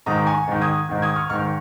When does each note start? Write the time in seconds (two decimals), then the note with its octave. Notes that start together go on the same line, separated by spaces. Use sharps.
0.06 G#2 D#3 A#5 D#6
0.26 G#5 C#6
0.48 G#2 D#3
0.62 D#6 G#6
0.89 G#2 D#3
1.02 D#6 G#6
1.16 C#6 F6
1.29 G#2 D#3 C#6 F6